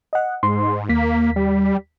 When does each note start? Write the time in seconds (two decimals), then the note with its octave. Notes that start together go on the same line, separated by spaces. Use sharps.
0.13 D#5 F#5
0.43 G#2 C6
0.89 D#2 A#3 B6
1.36 G3